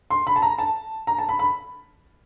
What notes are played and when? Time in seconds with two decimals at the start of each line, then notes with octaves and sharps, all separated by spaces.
0.10 C6
0.27 B5
0.36 A5
0.42 A#5
0.58 A5
1.07 A#5
1.18 A5
1.29 B5
1.39 B5